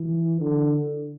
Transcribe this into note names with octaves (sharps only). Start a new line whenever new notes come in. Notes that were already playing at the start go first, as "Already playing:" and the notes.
Already playing: E3
D3